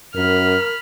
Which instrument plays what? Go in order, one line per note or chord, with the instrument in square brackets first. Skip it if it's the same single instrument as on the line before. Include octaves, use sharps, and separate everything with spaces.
[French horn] F#2 [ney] A#4 [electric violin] B5 F6